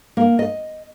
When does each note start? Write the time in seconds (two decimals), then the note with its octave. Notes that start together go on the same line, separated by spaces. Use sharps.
0.17 A#3
0.39 D#5